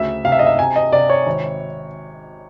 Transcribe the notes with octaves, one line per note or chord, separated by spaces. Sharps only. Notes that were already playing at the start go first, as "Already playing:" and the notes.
Already playing: D2 C#3 E5
C3 F5
E5
D#5
E5
C3 G#5
D#5
C3 D5
C#5
G#1